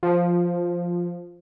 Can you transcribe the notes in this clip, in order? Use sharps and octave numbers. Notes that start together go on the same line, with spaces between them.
F3